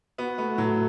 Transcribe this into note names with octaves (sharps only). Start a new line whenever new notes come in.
B3 F#4
A3 B3
A2 F#3